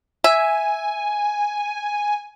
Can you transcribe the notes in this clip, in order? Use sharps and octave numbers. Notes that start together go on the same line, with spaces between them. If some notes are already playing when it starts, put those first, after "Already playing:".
E5 G#5